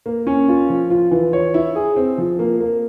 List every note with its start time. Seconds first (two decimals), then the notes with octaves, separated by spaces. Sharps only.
0.06 A#3
0.27 C#4
0.48 F4
0.69 F3
0.90 F4
1.11 E3
1.33 C#5
1.54 E4
1.75 G#4
1.96 C4
2.18 F3
2.39 A#3
2.60 A#3